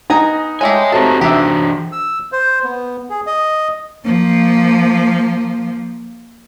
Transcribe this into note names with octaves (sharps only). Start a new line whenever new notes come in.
B3 D#4 G#5 A#5
G#3 A3 G4 C#5 D#5 E5 G#5
C4 F#4 G4 A4 C5 A5 A#5
E3 D4 G4 E5
E6
C5
B3
G#4
D#5
F3 A#3